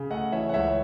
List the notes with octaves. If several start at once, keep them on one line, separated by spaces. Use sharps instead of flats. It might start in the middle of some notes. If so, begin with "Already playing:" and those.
Already playing: C#3
A3 D#5 F#5
E3 C#5 E5
F#5
C#2 C#5 E5